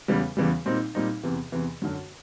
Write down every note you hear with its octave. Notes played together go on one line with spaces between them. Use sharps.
E2 C#3 E3 G3
E2 C#3 E3 G3
A#2 G3 C4 D#4
A#2 G3 C4 D#4
E2 C3 E3
E2 C3 E3
F#2 D3 F#3